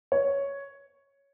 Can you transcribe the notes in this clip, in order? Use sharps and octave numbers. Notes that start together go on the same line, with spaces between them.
C#5